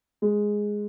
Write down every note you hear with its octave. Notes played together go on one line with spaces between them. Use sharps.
G#3